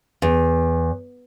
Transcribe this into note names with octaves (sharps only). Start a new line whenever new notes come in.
E2